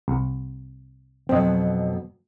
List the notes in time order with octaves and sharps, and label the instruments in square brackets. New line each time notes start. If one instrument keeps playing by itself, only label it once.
[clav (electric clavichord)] C2
[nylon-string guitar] F2 B2 F#3 [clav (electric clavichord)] C4 D#5